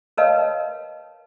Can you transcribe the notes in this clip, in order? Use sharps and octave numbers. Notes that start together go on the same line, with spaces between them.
A#4 B4 C#5 D#5 F5 A5